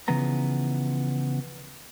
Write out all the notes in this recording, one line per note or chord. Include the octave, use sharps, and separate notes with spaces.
C#3 E3 F3 B3 A#5